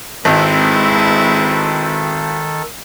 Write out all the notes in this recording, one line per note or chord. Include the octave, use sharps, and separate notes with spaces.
G#1 D#3 G#3 C4 E4 A4 B4